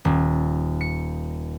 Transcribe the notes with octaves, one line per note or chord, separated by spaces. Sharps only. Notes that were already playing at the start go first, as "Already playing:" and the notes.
D#1
C#7